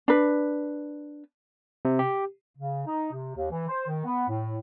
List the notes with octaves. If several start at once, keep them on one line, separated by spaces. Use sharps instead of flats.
D4 B4
C3
G4
C#3
D#4
C3
D#2
E3
C5
D#3
B3
A2